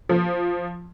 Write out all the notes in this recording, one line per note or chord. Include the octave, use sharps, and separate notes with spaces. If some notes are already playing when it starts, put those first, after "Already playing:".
F3